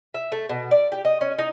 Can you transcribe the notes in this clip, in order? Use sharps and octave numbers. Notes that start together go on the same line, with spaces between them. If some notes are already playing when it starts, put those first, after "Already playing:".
E5
A3
B2
D5
G4
D#5
C#4
D#4